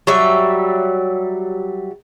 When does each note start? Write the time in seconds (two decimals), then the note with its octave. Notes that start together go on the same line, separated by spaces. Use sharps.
0.07 F#3 G3 E5